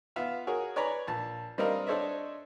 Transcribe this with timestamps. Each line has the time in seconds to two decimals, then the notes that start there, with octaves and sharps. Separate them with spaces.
0.16 B3 F4 E5 F5 F6
0.47 F#4 G#4 A#4 C#5
0.76 B4 C#5 D5 G#5 A#5 B5
1.08 A#1 A5
1.58 G3 C4 D4 A#4 D#5 F5
1.87 D4 A4 C5 C#5 D#5 E5